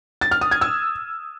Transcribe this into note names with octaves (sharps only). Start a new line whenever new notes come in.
A6
F6
D#6
G#6
E6